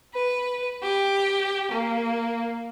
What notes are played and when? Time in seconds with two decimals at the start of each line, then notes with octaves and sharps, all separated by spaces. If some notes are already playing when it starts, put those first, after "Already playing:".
0.13 B4
0.82 G4
1.70 A#3